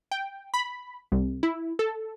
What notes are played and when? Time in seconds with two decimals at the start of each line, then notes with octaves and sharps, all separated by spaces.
0.11 G5
0.54 B5
1.12 C2
1.43 E4
1.79 A4